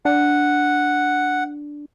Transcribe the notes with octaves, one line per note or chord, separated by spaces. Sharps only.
D4 F#5